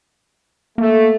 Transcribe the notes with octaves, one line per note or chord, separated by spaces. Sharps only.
A3 A#3